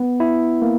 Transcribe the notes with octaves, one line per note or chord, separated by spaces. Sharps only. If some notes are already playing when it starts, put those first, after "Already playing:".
Already playing: B3
E4
A#3